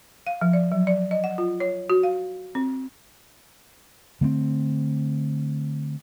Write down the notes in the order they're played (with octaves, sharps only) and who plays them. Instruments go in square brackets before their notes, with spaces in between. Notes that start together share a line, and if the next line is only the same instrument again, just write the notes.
[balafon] F5
F3
D5
F#3
D5
D#5
F#5
F4
C#5
F#4
F5
C4
[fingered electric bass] D3 A3 B3 C4